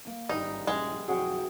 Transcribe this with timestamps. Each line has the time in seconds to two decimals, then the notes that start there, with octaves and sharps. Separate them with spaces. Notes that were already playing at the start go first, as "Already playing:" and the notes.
0.07 A#3
0.29 G#1 G2 G3 D#4
0.67 A#1 G2 G#3 C#4
1.08 B1 F2 F#4 G#4 G5